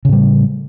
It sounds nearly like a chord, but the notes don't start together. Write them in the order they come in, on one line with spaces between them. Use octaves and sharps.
C#3 A2 G3